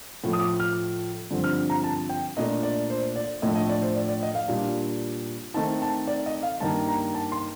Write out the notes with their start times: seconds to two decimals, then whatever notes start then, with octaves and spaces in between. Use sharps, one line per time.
0.24 A2 F3 A3
0.33 D#6
0.41 D6
0.60 F6
1.31 G2 D3 F3 C4
1.44 F6
1.70 A#5
1.84 A5
2.09 G5
2.37 A#2 A3 D4 D#5
2.63 D5
2.90 C5
3.16 D5
3.42 A2 F3 A3 D4 D#5
3.55 D#5
3.69 D5
3.82 C5
3.96 D5
4.09 D5
4.23 D#5
4.35 F5
4.48 A#2 G3 D4
5.54 D#3 A3 C4 D#4 A5
5.82 A5
6.08 D5
6.26 D#5
6.43 F5
6.60 G2 D#3 A#3 D#4 A5
6.88 A#5
7.15 A5
7.32 C6